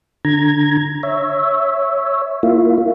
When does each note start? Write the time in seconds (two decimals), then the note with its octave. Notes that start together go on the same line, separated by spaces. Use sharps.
0.25 D3 A#5 G#6
1.03 C#5 E5
2.43 A#3 E4 F4